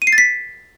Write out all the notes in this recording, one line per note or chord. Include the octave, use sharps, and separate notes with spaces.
D#7
C7
A6
B6